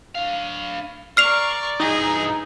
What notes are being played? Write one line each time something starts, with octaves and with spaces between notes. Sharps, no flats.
D4 F5
A#4 D5 C#6 F6 C7 F7
G2 E3 D#4 G#4